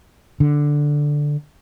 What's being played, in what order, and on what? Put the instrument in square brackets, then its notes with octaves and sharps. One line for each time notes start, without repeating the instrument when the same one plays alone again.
[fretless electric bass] D3